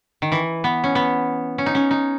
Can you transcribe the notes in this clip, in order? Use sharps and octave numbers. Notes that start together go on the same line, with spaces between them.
D#3
E3
B3
C#4
B3
C#4
D#4
C#4
D#4